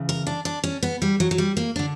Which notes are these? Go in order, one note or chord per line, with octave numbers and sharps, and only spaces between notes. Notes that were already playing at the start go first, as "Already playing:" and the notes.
Already playing: D2 C#3 E3
A#4
D4
D4
C#4
B3
G3
F#3
F#3
G3
A#3
D3 D4